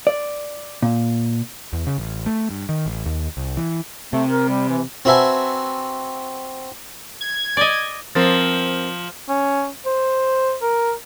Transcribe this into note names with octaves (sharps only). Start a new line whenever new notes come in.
D5
A#2
E2
C#3
A1
A3
G2
D#3
A1
D#2
C2
E3
C3 A3
A#4
G3
E3
C4 F#4 B4 E5 G#5 A5
G#6
D5 D#5
F3 C4 A#4 A6
C#4
C5
A#4